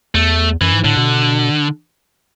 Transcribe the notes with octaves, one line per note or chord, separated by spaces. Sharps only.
E2 A3
F#2 E3
G#2
A2 D3
B2